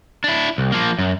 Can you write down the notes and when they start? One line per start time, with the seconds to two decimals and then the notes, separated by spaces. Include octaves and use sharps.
0.24 D4 E4
0.58 C2
0.72 F3 A#3
0.99 F#2